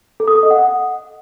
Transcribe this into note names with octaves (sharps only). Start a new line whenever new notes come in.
A4
D#6
A4
D#5
F#5